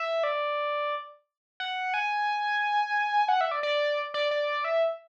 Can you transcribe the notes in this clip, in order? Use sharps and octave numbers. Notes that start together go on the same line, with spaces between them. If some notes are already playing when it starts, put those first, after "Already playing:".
Already playing: E5
D5
F#5
G#5
F#5
E5
D5
D5
D5
D5
E5